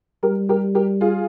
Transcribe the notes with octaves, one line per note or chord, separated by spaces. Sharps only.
G3 G4 A#4
G4 A#4
G4 A#4
F4 G#4